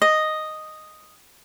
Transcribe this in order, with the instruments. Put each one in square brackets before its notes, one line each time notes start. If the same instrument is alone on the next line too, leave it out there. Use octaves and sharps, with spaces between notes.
[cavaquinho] D#5